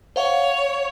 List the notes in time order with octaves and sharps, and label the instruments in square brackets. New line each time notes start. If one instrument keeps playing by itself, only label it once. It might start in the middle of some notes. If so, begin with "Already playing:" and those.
[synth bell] C5 F5 F#5 [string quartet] C#5